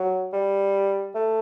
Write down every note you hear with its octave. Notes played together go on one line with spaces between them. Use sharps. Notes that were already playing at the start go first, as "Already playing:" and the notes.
Already playing: F#3
G3
A3